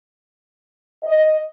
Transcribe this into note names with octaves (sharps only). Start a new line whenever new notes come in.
D#5